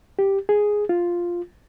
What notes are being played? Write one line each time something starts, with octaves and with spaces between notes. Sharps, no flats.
G4
G#4
F4